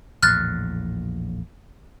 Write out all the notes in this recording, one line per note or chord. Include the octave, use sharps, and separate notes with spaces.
A#1 E2 A2 F6 F#6 A6